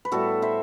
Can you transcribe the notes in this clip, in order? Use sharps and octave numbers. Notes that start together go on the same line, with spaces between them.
B4
A2 G3 B3 F#4 A4
C5 E5